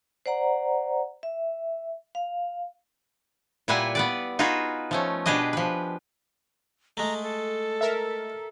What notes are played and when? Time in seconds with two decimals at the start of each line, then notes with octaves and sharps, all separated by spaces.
0.26 C5 D5 F#5 A#5
1.23 E5
2.15 F5
3.68 A#2 G3 E4 B4 F#5 G#5
3.95 B3 B4 D5
4.39 D#4 F4 F#4 G#4 B4
4.91 F3 A3 C#4
5.26 B2 D4 G4 G#4 B4 D#5
5.53 F3 B4
6.97 G#3 A3 A#5
7.22 A4
7.81 A#4 E5